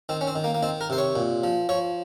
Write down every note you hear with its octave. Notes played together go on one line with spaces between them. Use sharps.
D#3 C4
C#4
C4
D#3
A#3
A#3
D#3 C4
A#4
C3 C5
C#5
A#2
F3
F3 C#5